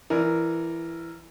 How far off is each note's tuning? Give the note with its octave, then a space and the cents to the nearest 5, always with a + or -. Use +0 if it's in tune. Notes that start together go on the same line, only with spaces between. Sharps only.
E3 +15 A#4 +0 D5 +20